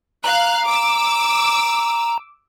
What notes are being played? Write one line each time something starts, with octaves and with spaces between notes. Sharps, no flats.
F5 A#5 F#6
D6 E6